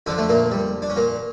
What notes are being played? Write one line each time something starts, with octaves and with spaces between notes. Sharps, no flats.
F2 D3 F3 D4
A3
A#2 A#3
G3
D4
C#4
A#2 A#3